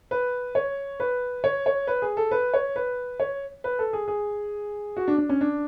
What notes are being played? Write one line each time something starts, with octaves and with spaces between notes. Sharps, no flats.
B4
C#5
B4
C#5
C#5
B4
G#4
A4
B4
C#5
B4
C#5
B4
A4
G#4
G#4
F#4
D4
D4
C#4
D4